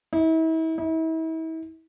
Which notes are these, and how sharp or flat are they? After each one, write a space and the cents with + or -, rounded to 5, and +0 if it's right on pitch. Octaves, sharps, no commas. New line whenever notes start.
E4 -40
E4 -40